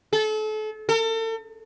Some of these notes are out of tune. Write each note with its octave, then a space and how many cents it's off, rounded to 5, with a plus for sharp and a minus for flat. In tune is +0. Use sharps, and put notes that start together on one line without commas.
A4 -35
A4 +40